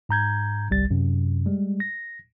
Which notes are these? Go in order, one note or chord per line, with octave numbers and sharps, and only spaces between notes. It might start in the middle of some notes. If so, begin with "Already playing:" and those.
G#2 A#5 G6 G#6
G1 C2 G3 A6
F#2 C3
G3 G#3
A#6